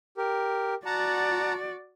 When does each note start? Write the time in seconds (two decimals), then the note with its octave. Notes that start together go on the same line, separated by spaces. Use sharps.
0.17 G4 A#4
0.86 F#4 D5 F#5 A5 A#5